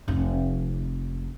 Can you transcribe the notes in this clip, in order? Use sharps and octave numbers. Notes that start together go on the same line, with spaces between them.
F1 D#4